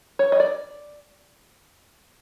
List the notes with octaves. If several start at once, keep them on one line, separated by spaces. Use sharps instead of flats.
C#5
D#5
D5